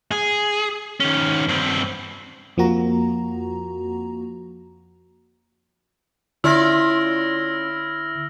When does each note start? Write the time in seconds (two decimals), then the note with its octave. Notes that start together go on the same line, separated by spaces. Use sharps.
0.11 G#4
1.00 D#3 C#4
1.49 G2 C4
2.57 F2 F3 A#3 F#4 A#5
6.44 D3 C#4 E4 F4 D5 E6 F6 A#6